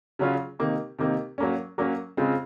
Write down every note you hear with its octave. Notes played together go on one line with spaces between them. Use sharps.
C#3 F#3 C#4 F4
C3 D#3 A#3
C3 D#3 A#3
F#3 A#3 C#4
F#3 A#3 C#4
C#3 G#3 C4 F4